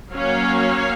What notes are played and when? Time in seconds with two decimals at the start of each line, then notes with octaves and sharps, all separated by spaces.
0.13 F#3 A#3 C#4 C#5 F5